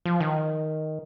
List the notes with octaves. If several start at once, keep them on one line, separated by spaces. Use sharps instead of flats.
F3
D#3